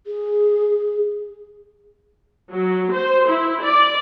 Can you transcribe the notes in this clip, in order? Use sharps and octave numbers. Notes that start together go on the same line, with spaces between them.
G#4
F#3
C5
E4
D5